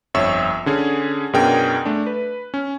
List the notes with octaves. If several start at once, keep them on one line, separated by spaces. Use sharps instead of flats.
G1 F2 C#5 E5 C#6 E6
D3 C#4 G#4
F#2 B2 D4 G#4 A#4 G5
A3 D4
B4
C#4